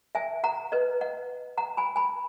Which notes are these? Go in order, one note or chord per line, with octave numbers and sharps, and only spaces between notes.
E5 G#5
F#5 A#5
B4 D#5
D#5 F#5
F#5 A#5
G#5 B5
G#5 B5